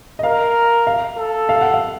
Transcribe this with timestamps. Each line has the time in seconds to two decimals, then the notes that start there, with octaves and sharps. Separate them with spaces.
0.19 D#5
0.23 A#4 F5
0.87 F5
1.18 A4
1.49 F5
1.61 F#5
1.74 F5